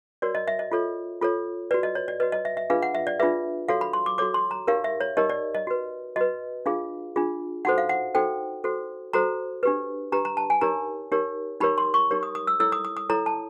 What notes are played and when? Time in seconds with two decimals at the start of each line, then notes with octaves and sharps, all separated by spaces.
0.22 F#4 A#4 C#5 D5
0.35 D#5
0.48 E5
0.59 D#5
0.72 F4 A4 C#5
1.22 F4 A4 C#5
1.71 F#4 B4 D5
1.83 D#5
1.95 C#5
2.08 D5
2.20 F#4 B4 D#5
2.32 D#5
2.45 E5
2.57 E5
2.70 D4 F4 G#4 B4 F5
2.82 F#5
2.95 E5
3.07 D5
3.20 D4 F4 G#4 B4 E5
3.68 F#4 A4 C#5 F5
3.81 B5
3.93 C6
4.06 D6
4.18 F#4 A4 C#5 D6
4.34 C6
4.51 A#5
4.67 D#4 G4 A#4 C#5 F5
4.84 E5
5.01 C#5
5.17 D#4 G4 A#4 C#5 D#5
5.30 D5
5.55 D#5
5.67 F#4 B4
6.16 F#4 B4 D#5
6.66 D4 F4 G#4 F5
7.16 D4 F4 G#4
7.65 D#4 F#4 A4 C5 F#5
7.78 F5
7.89 F#5
8.14 D#4 F#4 A4 C5 G5
8.64 F#4 A4 C5
9.13 F#4 A4 C5 A#5
9.63 D4 G4 B4
10.12 D4 G4 B4 A#5
10.25 A#5
10.37 A5
10.50 G#5
10.61 D#4 G4 A#4 C#5 A#5
11.12 D#4 G4 A#4 C#5
11.61 D#4 G4 A#4 C#5 B5
11.78 C6
11.94 C#6
12.11 D#4 G4 A#4 C#5
12.23 D#6
12.35 D#6
12.47 E6
12.60 E4 A4 C#5 E6
12.72 D#6
12.85 D#6
12.97 D#6
13.10 E4 A4 C#5 A#5
13.26 A5